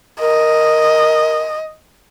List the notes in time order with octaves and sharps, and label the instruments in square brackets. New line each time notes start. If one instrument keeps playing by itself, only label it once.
[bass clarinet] A#4 [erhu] D#5